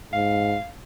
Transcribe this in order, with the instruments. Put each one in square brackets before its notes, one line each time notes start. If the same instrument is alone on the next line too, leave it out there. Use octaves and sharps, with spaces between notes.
[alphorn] G#2 [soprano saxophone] F5